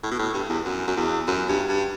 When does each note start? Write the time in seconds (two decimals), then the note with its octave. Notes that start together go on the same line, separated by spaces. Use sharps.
0.03 A2
0.11 B2
0.19 A2
0.34 G2
0.49 E2
0.65 F#2
0.88 F#2
0.97 E2
1.28 F#2
1.49 G2
1.68 G2